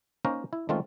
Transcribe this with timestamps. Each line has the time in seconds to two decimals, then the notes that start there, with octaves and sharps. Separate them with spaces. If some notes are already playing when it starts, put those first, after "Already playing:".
0.25 A#3 C#4 D#4 A#4 C5
0.53 E4
0.69 D#3 G#3 A3 C4 C#4 F4